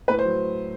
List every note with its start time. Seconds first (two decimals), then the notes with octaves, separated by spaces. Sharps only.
0.08 A2 B4
0.19 C5
0.25 F#3